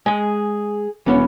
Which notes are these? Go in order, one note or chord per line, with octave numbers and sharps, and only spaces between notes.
G#3 G#4 G#5
E1 E3 B3 C#4